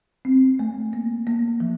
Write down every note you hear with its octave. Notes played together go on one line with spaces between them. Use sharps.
C4
A3
A#3
A#3
F3